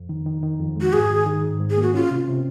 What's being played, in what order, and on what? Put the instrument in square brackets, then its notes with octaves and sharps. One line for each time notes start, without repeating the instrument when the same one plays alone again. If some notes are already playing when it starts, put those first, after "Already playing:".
Already playing: [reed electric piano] F2
D#3
D#3
D#3
F2
G#3
[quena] F#4
[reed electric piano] G#2 [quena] G#4
[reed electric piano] D#3
D#3
G#2
G#2
[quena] G#4
[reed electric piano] A#3 [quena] F#4
[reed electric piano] C#4 [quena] F4
[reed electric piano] C3
C3